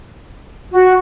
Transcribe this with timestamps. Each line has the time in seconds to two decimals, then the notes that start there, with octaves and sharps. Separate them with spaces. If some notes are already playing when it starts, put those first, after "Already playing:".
0.72 F#4